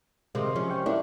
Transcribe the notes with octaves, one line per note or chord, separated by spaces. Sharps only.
C3 D#3 G#3
F3 C#4
G5 C#6
A#3 C#4 D4 E4